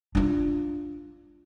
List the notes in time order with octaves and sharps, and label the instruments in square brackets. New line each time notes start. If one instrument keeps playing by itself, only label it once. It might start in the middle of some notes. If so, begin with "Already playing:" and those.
[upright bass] D4 F4